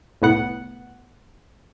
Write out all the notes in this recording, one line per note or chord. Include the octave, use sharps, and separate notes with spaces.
C2 A2 B3 F#5